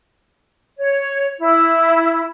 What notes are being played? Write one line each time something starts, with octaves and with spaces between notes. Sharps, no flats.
C#5
E4